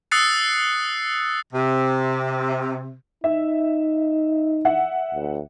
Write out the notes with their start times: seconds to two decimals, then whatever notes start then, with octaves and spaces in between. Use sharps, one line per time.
0.11 D#6 E6 F#6 A6 C7 C#7
1.53 C3
3.24 D#4 E5
4.65 E5 F#5
5.14 D2